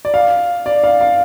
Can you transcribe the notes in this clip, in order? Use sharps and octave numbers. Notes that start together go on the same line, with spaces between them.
D5
F5
D5
F5
F5